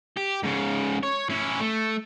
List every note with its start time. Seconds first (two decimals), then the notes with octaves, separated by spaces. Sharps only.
0.17 G4
0.44 G#2 C#3
1.03 C#5
1.30 C#4 E4
1.60 A3